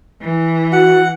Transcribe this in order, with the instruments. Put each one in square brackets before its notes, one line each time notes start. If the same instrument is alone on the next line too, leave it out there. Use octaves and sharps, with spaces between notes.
[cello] E3
[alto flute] F#4 [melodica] F#5